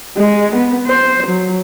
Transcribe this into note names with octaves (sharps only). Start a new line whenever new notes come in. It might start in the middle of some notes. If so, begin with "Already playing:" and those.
G#3
B3
C5
F#3